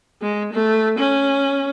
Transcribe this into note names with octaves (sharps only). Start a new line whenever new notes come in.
G#3
A3
C#4